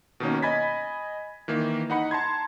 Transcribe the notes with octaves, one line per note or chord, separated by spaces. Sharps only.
B2 D#3 A#3 C#4
D#5 G#5 B5 G#6 A6 B6
D#3 E3 A#3
D#4 F#5 B5 C#7
A5 A#5 C6 G#6